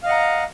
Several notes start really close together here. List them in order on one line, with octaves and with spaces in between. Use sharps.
F5 D#5 F#5 A#5